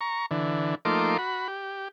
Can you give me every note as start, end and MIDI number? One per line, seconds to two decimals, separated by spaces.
0.01 0.26 82
0.01 0.26 85
0.31 0.75 50
0.31 0.75 52
0.85 1.17 53
0.85 1.17 57
0.85 1.17 58
0.85 1.17 63
0.85 1.17 84
0.85 1.17 86
1.18 1.48 66
1.18 1.48 83
1.48 1.88 67